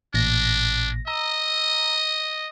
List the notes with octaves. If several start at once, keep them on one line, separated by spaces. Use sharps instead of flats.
A1 A#2 D4 A#6
D#5 A#5 E6